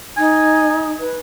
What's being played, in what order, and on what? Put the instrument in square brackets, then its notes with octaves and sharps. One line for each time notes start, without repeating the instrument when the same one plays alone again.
[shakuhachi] D#4 [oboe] G#5
[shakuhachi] B4